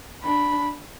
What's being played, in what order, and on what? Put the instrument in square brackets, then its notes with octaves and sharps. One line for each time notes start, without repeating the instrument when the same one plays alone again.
[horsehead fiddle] D4 [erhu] B5